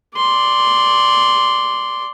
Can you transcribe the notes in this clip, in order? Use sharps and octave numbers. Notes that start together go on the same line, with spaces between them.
D5 C6